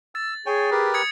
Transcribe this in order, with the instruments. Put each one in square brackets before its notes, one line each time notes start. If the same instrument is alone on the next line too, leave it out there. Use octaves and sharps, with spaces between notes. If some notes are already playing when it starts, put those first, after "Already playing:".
[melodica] E6 [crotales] A6
[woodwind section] G#4 [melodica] C#5 G5 G#5
[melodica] G4 A#4 B4
[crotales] D#6 G#6 C#7